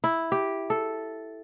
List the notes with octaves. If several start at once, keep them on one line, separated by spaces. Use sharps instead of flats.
E4
G4
A4